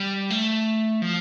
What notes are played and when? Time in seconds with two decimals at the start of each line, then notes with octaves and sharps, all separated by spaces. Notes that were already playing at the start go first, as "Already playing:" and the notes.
Already playing: G3
0.30 A3
1.02 F3